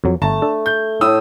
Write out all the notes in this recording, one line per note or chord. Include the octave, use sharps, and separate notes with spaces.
F2 F#3
G1 A3 A5 A#5
D4 A4
G6
A2 D#6 E6